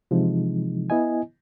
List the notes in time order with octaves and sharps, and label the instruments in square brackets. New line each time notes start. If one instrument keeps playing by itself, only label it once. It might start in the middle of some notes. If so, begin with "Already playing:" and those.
[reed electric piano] C3 E3 F3 G#3 D#4
B3 E4 D#5 G#5